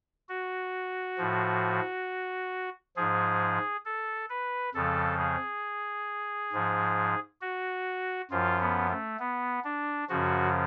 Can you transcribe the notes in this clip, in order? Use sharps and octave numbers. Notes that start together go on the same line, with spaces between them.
F#4
A2 F3
G#2 F3 G#4
A4
B4
F2 C#3 F3 A4
G#4
G#2 F3
F#4
F#2 F3 F4
B3
A3
B3
D4
F#2 C#3 F3 F#4